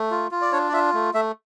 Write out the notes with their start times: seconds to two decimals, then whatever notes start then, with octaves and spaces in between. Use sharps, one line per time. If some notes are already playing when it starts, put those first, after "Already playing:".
Already playing: A3
0.11 F4
0.31 F4
0.41 D5
0.52 D4 C#5
0.68 D5
0.73 F4 E5
0.94 A3
1.14 A3 E5